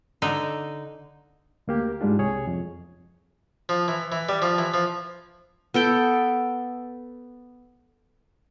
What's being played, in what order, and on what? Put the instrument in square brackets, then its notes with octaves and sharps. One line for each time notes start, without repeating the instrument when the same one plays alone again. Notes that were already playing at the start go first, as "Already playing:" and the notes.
[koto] D3 D#4
[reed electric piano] D2 A#3 G4
G#2 G3 G#3 D4 F4
C2 G#4 C#5
F2
[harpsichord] F3
E3
E3
G3
F3
E3
F3
[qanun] B3 A4 G5